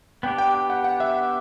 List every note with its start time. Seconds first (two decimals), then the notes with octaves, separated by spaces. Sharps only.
0.23 B3 D4 G4 G5
0.38 G5
0.54 G5
0.70 F#5
0.84 F#5
1.00 E5